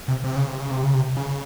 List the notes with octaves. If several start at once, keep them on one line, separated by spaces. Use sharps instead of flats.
C3
C3
C#3
C3
C#3
C3
C#3
C3
C#3